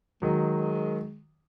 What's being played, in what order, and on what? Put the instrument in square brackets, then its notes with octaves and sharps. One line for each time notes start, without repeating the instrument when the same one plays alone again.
[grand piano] D#3 F#3 [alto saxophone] G#3